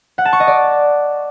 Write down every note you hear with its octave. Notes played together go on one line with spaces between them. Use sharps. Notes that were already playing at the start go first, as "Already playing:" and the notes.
F#5
A5
C#6
D#5
D5